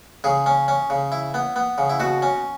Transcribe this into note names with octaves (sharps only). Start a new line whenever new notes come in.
C#3 G#4
C#4
C#4
C#3
E4
B3
B3
C#3
E4
B2 F#4
C#4